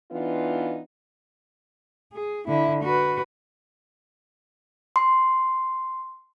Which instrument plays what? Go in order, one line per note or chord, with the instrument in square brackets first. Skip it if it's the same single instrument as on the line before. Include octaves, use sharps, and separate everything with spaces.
[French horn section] E3 B3 D4 D#4 F4
[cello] G#4
D3 E4
F#4 B4
[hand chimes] C6